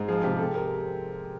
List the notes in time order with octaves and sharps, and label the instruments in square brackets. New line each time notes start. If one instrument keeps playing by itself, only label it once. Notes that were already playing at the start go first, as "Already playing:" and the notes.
Already playing: [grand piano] G#2
[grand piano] F3 [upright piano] G#4
[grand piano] C3 [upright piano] G4
[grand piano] C3 [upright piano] A4
[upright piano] A#4